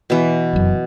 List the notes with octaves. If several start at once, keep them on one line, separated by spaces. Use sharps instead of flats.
B2 E3
F1 F#2